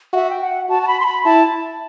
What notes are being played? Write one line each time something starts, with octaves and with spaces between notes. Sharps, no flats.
F#4 E5
G5
F#5
F#4 A5
A5
B5
C6
B5
E4 A5